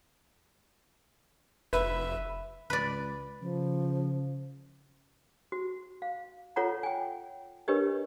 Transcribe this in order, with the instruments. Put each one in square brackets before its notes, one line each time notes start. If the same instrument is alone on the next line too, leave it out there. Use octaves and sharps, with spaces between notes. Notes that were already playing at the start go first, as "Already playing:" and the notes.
[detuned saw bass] F1 [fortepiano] B4 [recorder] E5
[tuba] C#2 [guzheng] B4 D5
[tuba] C#3 [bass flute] F3
[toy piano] F#4
F5
F4 A4 C#5 F#5 A#5
G5 G#5
D4 G4 A#4 B4 C#5 D#5